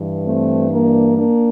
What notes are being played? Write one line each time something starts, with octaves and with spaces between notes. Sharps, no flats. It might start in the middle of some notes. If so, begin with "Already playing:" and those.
Already playing: G2 E3
A3 C4
A#3 D4
A#3 D4